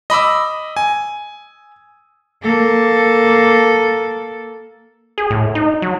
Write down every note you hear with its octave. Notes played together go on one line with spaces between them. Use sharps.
D#5 B5 D6 E6
G#5
A#3 A4
G#4
A2
D#4
F#3